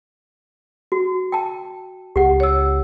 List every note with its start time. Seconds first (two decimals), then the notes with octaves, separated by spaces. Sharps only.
0.92 F#4
1.32 G5 A5
2.16 C#2 G4 F#5
2.40 C#5 E6